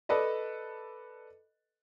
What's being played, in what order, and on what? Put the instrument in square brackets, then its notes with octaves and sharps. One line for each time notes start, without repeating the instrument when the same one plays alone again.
[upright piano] A4 B4 D5 D#5